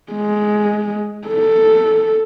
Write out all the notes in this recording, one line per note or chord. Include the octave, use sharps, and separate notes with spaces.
G#3
A4